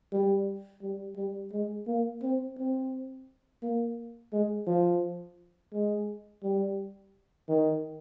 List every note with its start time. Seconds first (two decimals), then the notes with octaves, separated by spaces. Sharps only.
0.12 G3
0.82 G3
1.17 G3
1.53 G#3
1.87 A#3
2.22 C4
2.58 C4
3.63 A#3
4.33 G#3
4.67 F3
5.74 G#3
6.44 G3
7.49 D#3